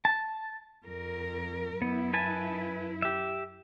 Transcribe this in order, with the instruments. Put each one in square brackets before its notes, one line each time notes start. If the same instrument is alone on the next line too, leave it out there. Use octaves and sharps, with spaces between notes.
[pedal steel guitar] A5
[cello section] F2 A#4
[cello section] F#2 E4 [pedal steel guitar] B3
[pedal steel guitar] B4 G#5 A5
G4 E5